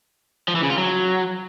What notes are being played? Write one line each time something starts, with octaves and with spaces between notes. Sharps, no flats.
F3
E3
C#3
F4
F#3